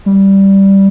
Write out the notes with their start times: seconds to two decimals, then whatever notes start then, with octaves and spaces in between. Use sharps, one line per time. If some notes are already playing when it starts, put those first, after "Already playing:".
0.06 G3